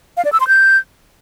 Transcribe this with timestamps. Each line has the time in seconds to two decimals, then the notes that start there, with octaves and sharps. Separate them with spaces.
0.17 F5
0.25 D5
0.32 E6
0.40 C6
0.48 G6